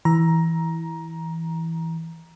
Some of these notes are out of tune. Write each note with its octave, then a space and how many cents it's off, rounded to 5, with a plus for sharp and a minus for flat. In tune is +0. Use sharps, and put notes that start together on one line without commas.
E3 -5 A#5 +15